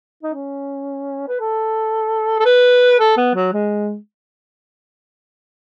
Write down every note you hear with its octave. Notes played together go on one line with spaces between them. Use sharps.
D#4
C#4
B4
A4
A4
B4
A4
B3
F#3
G#3